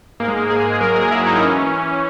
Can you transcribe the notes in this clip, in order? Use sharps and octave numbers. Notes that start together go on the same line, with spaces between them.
G#2 A#3
G#3
G#2 A#3
G#4
G#2
F#3 A#4
G#4
F#3
E4
G#2
D#4
E3 C#4
E3
E3